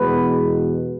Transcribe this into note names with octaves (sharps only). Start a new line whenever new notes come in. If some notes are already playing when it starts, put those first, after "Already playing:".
Already playing: E2 B2 G#3 B3 B4